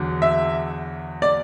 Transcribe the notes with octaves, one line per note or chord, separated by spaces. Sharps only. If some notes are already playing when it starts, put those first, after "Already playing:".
Already playing: E2 D3 F#3
E5
D5